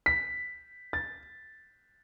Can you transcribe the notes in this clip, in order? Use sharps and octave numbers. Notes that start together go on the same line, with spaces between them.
B6
A6